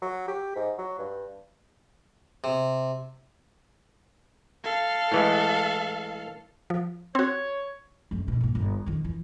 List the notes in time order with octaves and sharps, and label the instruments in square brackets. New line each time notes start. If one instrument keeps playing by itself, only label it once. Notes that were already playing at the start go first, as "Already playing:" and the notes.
[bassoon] F#3
G4
G#2
F#3
G2
[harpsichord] C3
[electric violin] A4 F5
[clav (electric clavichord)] A2 E3 G#3
[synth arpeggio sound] F3
[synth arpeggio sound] C4 F#4 [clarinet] C#5
[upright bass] F1 F#2
B2
G#2 A#3
G1
F2 D#3
E3